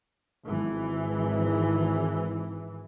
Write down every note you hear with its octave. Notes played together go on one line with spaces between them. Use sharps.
G#1 E3